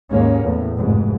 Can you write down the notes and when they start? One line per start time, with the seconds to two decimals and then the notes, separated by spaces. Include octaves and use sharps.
0.11 D#2 G#2 A#3 C#4
0.44 E2 A2
0.78 F1 G#2